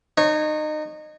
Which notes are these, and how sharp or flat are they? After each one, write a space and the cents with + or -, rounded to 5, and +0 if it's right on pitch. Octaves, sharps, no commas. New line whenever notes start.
D#4 -25 C#5 -20